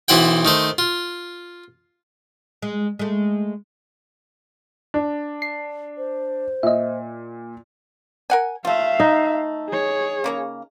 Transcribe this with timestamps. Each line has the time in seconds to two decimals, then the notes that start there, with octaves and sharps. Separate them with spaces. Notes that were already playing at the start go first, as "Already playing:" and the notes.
0.08 B1 E3 E4 C5 F#5 G5
0.45 D#3 A3 C5
0.78 F4
2.62 G#3
2.99 G#3 A3
4.94 D4
5.42 C7
5.97 C5
6.63 A#2 D#5 E5
8.30 A#4 F#5 G#5
8.65 A3 F4 E5 F5
9.00 D#4
9.69 G#4 C#5
10.24 C#3 A#3 A#5